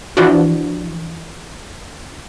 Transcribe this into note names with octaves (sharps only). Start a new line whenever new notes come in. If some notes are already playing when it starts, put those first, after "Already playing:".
E3 F3 D4 F#4